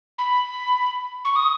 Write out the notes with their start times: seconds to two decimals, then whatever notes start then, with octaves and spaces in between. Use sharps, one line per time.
0.18 B5
1.25 C#6
1.36 D#6